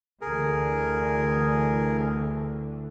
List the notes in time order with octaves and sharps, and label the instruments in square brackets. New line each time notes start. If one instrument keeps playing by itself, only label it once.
[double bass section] D2 D3 E3 [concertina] G#4 A#4